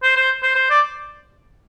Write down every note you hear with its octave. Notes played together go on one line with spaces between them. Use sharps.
C5
C5
C5
C5
D5